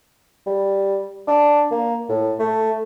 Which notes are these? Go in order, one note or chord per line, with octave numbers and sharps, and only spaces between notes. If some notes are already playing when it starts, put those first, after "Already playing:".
G3
D4
A#3
A2
A3